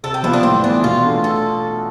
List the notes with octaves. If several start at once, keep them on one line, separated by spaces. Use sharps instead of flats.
C3 A4
G4
F3 B3 E4 F4
D4
A2 C4
E3 B3 D4
B2 F4
A3 D4 F4
A4